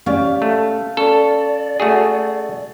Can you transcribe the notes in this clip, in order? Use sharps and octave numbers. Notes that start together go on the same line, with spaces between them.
C#4 G4 D5 F5
A3
C#4 A4 D5
A3 F#4 G#4